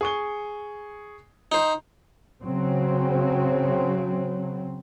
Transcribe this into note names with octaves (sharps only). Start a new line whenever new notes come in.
G#4 C#6 G7
D#4 C5
C#3 F#3 C4